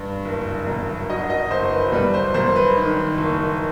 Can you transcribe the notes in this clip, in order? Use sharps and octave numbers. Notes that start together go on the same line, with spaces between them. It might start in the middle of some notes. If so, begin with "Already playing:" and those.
Already playing: G2
F#1
F#2
F#3 D#5
D#5
F#1 C5
B4
G3 B4
C5
F#2 C5
B4
D#3
F#1